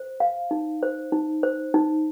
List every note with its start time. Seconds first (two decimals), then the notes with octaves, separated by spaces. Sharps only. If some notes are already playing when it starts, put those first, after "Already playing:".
Already playing: C5
0.20 F5
0.51 D#4
0.83 C5
1.12 D#4
1.43 C5
1.74 D#4